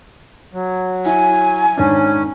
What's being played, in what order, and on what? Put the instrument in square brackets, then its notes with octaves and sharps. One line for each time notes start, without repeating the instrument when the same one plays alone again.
[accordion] F#3
[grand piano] E4 [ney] G#5
[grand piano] G#2 D#3 D4 [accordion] C#4